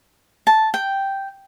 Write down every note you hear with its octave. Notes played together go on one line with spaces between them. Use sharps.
A5
G5